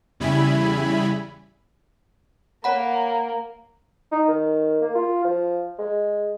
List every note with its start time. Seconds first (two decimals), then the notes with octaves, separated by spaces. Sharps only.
0.20 E2 C#3 G3 E4 G#5 B5
2.64 A#3 C#5 F#5 B5
4.12 D#4
4.28 D#3
4.81 A#3
4.95 F4
5.25 F3
5.79 G#3